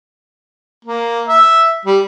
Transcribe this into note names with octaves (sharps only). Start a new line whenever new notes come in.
A#3
E5
G3